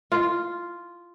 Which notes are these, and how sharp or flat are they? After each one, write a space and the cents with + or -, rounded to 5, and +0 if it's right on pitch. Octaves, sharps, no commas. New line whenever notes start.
F4 -5